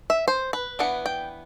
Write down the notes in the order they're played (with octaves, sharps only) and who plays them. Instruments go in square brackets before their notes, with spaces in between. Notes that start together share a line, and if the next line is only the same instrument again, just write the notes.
[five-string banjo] E5
C5
B4
E3 B3 D4 F#5
G5